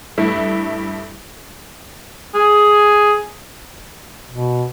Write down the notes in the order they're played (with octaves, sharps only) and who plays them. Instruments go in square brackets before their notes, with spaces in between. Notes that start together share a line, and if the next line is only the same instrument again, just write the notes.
[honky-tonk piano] G2 A3 E4
[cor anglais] G#4
[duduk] B2